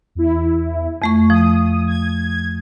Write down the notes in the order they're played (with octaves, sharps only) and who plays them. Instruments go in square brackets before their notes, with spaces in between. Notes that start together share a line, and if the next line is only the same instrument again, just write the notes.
[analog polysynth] E2 E4
[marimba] F2 A3 C#6
[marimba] F3 [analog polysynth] D#6
[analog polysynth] G#6